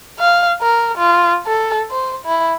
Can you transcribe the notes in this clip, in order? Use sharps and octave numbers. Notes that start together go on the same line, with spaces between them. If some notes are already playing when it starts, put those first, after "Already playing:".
F5
A#4
F4
A4
C5
E4